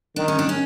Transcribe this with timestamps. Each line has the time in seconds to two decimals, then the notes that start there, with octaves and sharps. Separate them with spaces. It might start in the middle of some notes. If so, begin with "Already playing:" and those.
0.16 D#3 D4
0.28 C#4
0.39 D4
0.49 C#4